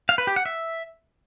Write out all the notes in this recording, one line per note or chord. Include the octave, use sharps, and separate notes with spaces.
F5
B4
G4
F#5
E5